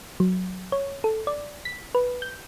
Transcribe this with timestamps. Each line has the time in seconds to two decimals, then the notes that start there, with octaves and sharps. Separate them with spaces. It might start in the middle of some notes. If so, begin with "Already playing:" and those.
0.20 F#3
0.72 C#5
1.04 A4
1.27 D5
1.65 B6
1.95 B4
2.22 G6